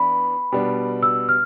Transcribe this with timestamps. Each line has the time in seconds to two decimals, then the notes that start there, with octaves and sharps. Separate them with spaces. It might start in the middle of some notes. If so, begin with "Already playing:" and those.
Already playing: E3 B3 D4 B5
0.52 B2 G3 D4
1.03 E6
1.29 F6